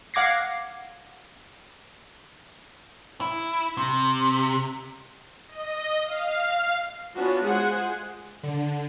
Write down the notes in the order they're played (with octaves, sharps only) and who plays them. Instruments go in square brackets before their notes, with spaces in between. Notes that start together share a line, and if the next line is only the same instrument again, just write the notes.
[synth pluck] F5 F#5 D6 G#6 A#6 C7
[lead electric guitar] E4
C3
[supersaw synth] D#5
F5
[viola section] B3 C#4 D4 F4 F#4
G#3 F4 G#4 C5 F#5 G#5
[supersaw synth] D3